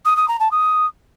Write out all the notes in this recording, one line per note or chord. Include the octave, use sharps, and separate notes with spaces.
D#6
D#6
A#5
A5
D#6